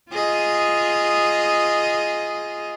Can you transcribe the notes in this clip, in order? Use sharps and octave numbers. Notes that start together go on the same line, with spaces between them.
F4 G#4 D#5